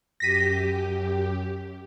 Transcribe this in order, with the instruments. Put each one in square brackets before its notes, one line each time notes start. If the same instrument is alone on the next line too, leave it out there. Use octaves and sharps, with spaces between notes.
[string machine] F#2 G4 [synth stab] A#6 B6 D#7